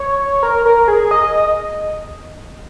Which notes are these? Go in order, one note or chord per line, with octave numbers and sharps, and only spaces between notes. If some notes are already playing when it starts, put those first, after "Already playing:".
Already playing: C#5
A#4
A#4
G#4
D#5